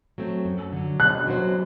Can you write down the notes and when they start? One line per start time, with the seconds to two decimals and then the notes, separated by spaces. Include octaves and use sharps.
0.18 F#3 A3 C4
0.45 F#2
0.73 D3 F#3
1.00 B2 F#6
1.27 F#3 B3 F#4 C5